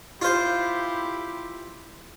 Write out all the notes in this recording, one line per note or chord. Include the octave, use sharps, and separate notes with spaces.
E4 F4 G4 C5